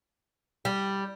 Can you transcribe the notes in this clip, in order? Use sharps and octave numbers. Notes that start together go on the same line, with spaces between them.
G3